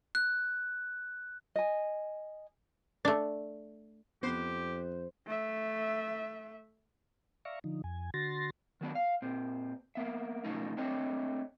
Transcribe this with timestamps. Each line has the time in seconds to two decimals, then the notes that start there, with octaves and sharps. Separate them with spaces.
0.15 F#6
1.56 D#5 G#5
3.05 A3 D4
4.23 F2 B3 G4 C5
5.27 A3 E5
7.45 D5 E5 F5 A#5 C#6
7.64 D3 F3 D#4
7.84 F2 G#5
8.14 D3 F#4 C6 A6 A#6
8.81 D#3 F#3 B3 D4
8.95 F5
9.22 A#2 C4
9.95 A#3 B3 E5
10.45 B2 F3 A3 C#4 D#4
10.77 A3 C4 D4 C#5 D#5